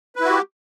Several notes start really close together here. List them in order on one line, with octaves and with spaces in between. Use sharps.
B4 E4 F#4 G4